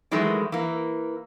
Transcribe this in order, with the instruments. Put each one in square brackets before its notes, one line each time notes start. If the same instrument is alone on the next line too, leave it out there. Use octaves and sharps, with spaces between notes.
[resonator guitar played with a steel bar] D#3 E3 F#3 G#3 A3
E3 A#3